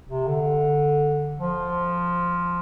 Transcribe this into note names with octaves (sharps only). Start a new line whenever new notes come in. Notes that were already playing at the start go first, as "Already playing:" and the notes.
C3
D3
F3